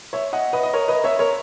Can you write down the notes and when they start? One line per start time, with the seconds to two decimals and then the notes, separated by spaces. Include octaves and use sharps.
0.13 C#5 E5
0.33 D#5 F#5
0.53 B4 D#5
0.63 D#5
0.73 A#4 C#5
0.88 B4 D#5
1.04 C#5 E5
1.19 A#4 C#5